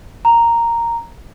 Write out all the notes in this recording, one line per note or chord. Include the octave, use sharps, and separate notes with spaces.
A#5